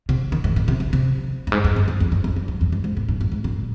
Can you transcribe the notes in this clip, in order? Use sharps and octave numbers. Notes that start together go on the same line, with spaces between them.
C3
D#3
G#2
A#2
C3
C3
C3
G2
G#2
G2
F2
G2
F2
G2
F2
F2
G2
F2
G2
G#2
A#2
G#2
G2
G#2
A#2